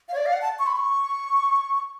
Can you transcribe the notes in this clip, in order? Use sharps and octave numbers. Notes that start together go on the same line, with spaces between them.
F5
C#5
D5
F5
F#5
A5
C#6
B5
C#6